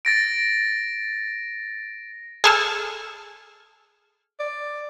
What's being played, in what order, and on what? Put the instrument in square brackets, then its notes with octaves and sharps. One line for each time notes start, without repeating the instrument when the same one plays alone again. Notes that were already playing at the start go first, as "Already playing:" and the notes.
[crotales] A6 A#6 D7
[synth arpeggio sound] G#4 A4 F6
[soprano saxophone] D5